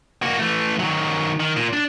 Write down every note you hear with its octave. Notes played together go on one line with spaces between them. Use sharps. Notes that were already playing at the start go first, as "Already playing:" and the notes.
A#3 F#4
E3 A3
D#3 F#3
D#3
A#2
D4